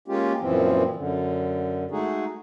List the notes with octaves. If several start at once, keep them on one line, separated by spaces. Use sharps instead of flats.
G#3 A#3 C#4 F4 G4
F#2 A#2 E3 F3 C4
F#2 D3
G#3 A3 D#4 F#4 G#4